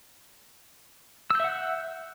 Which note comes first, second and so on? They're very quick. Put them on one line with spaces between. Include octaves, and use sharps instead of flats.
E6 G6 E5 F#5 F#6